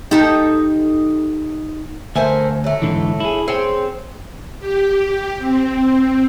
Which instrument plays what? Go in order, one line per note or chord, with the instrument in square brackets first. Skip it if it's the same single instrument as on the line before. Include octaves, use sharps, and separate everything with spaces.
[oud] D#4 G4 A4
[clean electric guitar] D2 G#5 [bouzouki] A3 A#3 C5
[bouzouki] F#3 A3
[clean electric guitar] G#2 D3 E3
E4 G#4
[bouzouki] C4 [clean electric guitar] G#4 C#5 G5
[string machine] G4
C4